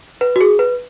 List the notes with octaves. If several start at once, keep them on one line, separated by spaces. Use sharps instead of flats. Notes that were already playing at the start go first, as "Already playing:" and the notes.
B4
F#4
G#4
B4